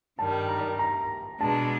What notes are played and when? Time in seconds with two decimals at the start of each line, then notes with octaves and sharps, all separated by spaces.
0.19 G2 D#3 G3 A5
0.49 A#5
0.79 A#5
1.41 B2 G#3 B3 D4 A5